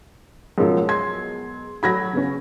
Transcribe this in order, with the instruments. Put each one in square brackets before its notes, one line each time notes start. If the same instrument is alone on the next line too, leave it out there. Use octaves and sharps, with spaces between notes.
[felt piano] F#2 F3 [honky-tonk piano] B2 F#3 G#3
[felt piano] C6 G#6
[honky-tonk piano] F#3 A3 F#4 [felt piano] B5 G#6 A#6
[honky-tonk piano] C#3 B3 C#4